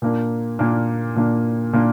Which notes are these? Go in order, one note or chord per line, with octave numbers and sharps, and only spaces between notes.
A#2 A#3 D4
A#2 A#3 D4
A#2 A#3 D4
A#2 A#3 D4